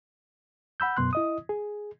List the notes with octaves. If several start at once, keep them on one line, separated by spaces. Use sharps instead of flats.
F#5 B5 E6 G6
F#2 B2 B3 C6 F#6
E4 D#5 D#6
G#4